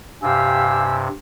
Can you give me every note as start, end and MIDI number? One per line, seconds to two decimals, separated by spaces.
0.23 1.08 43
0.23 1.08 48
0.23 0.84 67
0.23 0.84 77
0.23 1.00 80
0.23 0.95 88